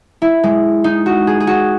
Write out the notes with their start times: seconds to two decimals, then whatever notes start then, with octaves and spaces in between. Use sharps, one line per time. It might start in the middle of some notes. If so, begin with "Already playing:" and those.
0.22 E4
0.43 G#3
0.84 D#4
1.06 F#4
1.27 G#4
1.40 G#4
1.47 F#4